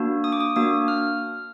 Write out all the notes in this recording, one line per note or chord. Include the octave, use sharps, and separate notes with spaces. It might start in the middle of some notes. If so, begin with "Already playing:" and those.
Already playing: A#3 D4 F#4
D#6
D6
D#6
A#3 D4 F#4 D#6
F6